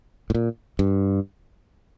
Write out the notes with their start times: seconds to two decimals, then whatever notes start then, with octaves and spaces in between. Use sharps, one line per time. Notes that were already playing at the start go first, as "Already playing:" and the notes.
0.30 A2
0.35 A#2
0.79 G2